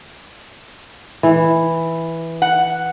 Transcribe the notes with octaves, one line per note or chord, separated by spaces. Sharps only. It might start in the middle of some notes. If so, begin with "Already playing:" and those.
E3
F#5